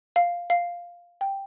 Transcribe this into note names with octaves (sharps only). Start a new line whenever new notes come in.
F5
F5
G5